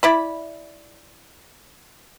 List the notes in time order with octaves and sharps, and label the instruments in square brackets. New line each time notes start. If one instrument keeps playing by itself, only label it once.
[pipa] E4 D5 B5